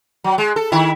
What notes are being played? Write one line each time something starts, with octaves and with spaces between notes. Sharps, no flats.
F#3
G#3
A4
D#3 E4